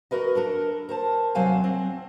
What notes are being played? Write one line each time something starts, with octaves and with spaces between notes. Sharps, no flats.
F#4 A#4 B4 D#5
D4 A4 A#4
A#4 C5 A5
D#2 C3 F#3 C5 F5 G#5
C4